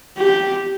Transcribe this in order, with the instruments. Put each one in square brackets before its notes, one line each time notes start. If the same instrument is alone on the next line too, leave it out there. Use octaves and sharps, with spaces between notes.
[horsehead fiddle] G4